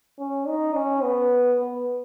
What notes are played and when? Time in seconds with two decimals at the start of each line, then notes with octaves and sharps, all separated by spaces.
0.19 C#4
0.47 D#4
0.75 C#4
1.03 B3
1.60 B3